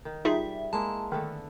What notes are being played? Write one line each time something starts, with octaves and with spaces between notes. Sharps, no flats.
D#3
G3 D#4 F4 G#4 D5 E5
G#3 A#3 E4 A5
D3 D#3 A3 B3